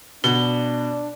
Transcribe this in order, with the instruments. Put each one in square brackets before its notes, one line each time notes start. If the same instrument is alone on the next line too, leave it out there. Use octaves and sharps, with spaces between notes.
[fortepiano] B2 [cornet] D4 [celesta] G7